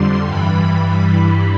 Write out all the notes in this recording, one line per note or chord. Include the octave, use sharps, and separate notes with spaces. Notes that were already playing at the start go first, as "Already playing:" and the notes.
Already playing: F2 D3 G3 C6
G2 E3 G3 B5